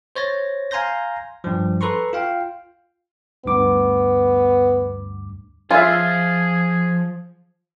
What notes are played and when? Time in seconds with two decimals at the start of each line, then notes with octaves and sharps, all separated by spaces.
0.16 C5 C#5 A6 A#6
0.71 F5 G#5 A#5 C6 G6 A#6
1.44 G2 F3
1.81 A4 B4 A#5 C6 C#6
2.13 F4 F5 G5
3.45 D2 G2 B3 D6
5.71 F3 F4 G#4 E5 G#5